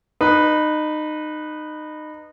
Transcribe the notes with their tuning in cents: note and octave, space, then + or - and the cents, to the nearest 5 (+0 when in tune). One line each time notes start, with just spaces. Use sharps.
D#4 -25 B4 -5